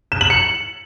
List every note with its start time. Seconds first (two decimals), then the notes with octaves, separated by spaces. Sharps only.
0.12 E7
0.21 F#7
0.30 C#7